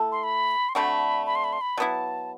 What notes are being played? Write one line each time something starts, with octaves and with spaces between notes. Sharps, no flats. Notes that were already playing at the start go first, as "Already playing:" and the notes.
Already playing: A3 E4 A4
C6
B5
C6
D3 A3 C4 F#4 B5
B5
C6
B5
C6
B5
F#3 B3 E4 A5